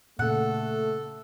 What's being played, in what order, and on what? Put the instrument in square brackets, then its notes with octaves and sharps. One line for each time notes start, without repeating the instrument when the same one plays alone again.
[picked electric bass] A#2 C#3 [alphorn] A3 [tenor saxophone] A4 [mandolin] F#5